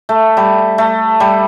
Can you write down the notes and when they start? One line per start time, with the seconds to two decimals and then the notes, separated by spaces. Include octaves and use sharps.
0.09 A3
0.37 G3
0.78 A3
1.20 G3